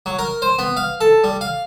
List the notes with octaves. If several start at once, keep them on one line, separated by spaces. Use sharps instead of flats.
F#3
A#4
C5
B3
F5
A4
G3
F5